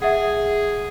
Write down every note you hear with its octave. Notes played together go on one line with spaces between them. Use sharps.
G#4 E5 F#5